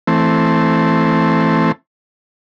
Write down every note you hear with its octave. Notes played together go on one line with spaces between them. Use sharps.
E3 A3 C4